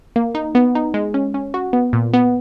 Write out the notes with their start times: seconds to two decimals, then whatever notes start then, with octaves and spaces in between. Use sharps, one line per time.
0.16 A#3
0.35 D#4
0.55 B3
0.75 D#4
0.94 G#3
1.14 C#4
1.34 C#4
1.54 F#4
1.73 B3
1.93 A#2
2.14 B3